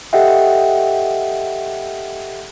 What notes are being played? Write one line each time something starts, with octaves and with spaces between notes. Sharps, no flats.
G4 A4 D#5 E5 F#5 G5